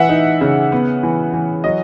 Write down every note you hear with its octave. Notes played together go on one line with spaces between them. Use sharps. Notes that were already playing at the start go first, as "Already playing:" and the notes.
Already playing: E3 E5 F#5
D#4
C#3
B3
E3
E3
F#3 D#5